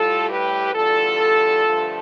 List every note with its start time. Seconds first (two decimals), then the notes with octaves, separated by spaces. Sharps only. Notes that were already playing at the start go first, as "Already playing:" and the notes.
Already playing: A2 G3 F4 A4
0.29 G4 B4
0.74 E2 D3 G3 F4 A4
1.65 G2 D3 F3 A3